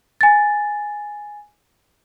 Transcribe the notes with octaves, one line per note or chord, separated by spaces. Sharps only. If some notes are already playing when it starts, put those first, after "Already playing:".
G#5 A6